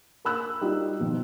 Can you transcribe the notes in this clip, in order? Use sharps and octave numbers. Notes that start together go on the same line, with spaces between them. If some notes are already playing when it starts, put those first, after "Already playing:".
A#3 B5 E6 F#6
G3 D#4 F4 F#4
B2 D#3 F3